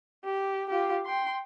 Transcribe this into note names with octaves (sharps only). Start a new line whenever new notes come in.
G4
F4 G4
G5 C6